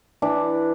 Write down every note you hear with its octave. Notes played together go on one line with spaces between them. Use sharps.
E3 D4